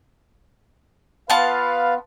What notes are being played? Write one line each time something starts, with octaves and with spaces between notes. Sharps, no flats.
B3 F4 B4 F5 A5